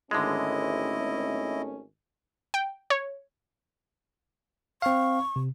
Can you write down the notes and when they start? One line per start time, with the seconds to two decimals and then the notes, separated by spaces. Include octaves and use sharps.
0.11 G#1 D3 G#3 A3 C#4 E4 D#5
2.54 G5
2.90 C#5
4.82 C4 F5 C#6
5.36 C3